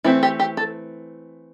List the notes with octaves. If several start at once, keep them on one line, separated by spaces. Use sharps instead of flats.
E3 A3 C4 E4
G4
G4
A4